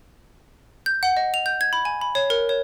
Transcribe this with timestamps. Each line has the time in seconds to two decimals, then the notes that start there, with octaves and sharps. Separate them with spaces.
0.86 G6
1.03 F#5
1.17 D#5
1.34 F7
1.46 G6
1.61 G#6
1.73 B5
1.85 G#5
2.01 B5
2.15 C#5
2.30 A#4
2.49 C#5